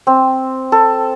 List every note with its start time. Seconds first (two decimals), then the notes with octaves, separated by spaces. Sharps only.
0.07 C4
0.72 A4